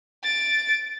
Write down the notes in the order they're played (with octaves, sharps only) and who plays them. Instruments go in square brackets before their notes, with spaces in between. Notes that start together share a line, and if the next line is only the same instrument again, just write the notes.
[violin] A6 D7